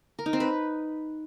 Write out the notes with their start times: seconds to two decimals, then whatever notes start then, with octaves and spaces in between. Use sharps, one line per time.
0.19 A#4
0.26 D#4
0.33 C4
0.40 B4